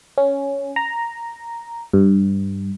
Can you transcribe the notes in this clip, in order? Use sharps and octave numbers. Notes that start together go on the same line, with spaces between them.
C#4
A#5
G2